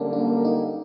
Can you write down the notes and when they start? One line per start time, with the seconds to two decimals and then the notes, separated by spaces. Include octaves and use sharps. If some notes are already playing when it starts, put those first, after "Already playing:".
Already playing: F#2 D3 G3 A#3 C#4
0.13 D4
0.45 D#4